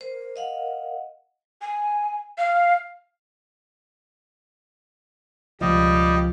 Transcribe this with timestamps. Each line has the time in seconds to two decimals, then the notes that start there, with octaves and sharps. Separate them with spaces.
0.01 A#4 C5
0.36 D#5 F5 F#5
1.61 G#5
2.38 F5
5.61 C#2 B2 F3 G3 D#5